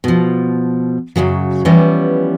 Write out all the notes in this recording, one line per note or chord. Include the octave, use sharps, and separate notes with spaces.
B2 F3
F#2 A#2 C#3 F#3
E3 F3 G3 B3 C#4